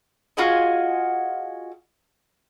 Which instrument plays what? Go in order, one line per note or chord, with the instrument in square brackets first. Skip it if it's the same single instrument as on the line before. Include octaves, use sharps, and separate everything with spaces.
[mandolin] F4 F#4 G#4 D#5